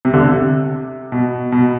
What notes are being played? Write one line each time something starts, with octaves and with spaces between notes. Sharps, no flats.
C3
D3
C3
B2
B2